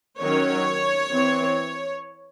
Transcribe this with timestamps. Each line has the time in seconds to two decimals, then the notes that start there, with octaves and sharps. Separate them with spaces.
0.20 D#3 F#3 C#4 C#5
1.12 E3 C4